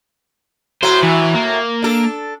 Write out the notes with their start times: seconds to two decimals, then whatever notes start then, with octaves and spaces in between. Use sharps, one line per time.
0.83 A2 F#3 A3 C5
1.03 E3
1.35 A#3
1.82 D4 A4